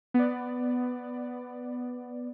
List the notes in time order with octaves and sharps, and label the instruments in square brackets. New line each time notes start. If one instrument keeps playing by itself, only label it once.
[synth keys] B3 D5